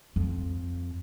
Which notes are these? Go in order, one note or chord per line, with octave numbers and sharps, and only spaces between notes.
F2